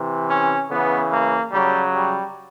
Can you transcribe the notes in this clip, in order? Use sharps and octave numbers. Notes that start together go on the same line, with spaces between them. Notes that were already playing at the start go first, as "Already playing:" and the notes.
Already playing: C3 E3
C#4
C#3 E3 B3
A#3
C#3 F#3 G3
G3